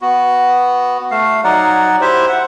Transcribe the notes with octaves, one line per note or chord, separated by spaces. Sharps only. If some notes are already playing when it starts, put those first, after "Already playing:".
B3 F#4
A3 F5
F#3 D#4 D5 F#5
E4 G4 C5 E5
F#5